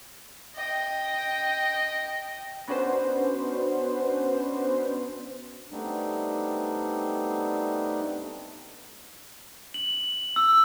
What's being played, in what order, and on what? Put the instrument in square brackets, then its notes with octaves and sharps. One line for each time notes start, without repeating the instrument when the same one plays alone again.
[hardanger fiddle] D#5 G5
[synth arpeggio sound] B3 C#4 D4 F#4 B4 C5
[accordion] G3 A3 B3 C4 D4 D#4
[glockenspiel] F#7
E6